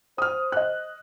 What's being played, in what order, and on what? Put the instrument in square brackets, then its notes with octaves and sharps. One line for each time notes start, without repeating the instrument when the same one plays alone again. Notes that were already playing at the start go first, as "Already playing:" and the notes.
[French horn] C5 [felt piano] D#6 F6
[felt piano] D#5 F#6